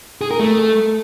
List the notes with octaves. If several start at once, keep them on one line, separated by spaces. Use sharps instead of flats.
G#4
A#4
A3